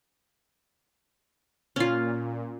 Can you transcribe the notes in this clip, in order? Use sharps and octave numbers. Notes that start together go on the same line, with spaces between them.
A#2 C#4 F4